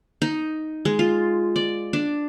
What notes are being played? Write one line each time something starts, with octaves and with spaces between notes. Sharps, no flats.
D#4
G#3
F4
D5
D4